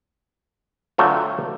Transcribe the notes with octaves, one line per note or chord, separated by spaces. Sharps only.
D3 F#3 A3 C4 F4